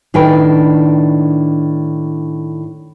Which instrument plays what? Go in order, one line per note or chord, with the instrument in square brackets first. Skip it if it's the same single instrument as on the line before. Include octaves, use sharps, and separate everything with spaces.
[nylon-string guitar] A2 D#3 D4 B4 G5